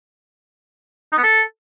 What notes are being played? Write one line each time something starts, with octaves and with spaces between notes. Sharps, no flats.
D#4
B3
A4